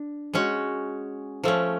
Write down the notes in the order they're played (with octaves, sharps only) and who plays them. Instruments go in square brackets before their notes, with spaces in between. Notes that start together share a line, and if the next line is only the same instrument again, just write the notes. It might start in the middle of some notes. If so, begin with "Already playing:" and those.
Already playing: [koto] D4
G#3 C#4 F#4
F3 A3 C#4